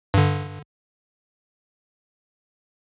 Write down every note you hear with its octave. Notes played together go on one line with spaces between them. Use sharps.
G2 D3